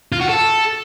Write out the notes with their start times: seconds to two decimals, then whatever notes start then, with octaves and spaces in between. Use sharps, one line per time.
0.12 F4
0.21 F#4
0.29 A4